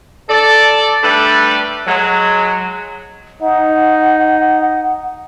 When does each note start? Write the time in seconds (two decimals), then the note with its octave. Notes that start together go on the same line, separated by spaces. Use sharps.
0.29 A4 D5
1.03 G3 A3 D4 A4 B4 D5
1.87 F#3 G#3
3.42 D#4 F#5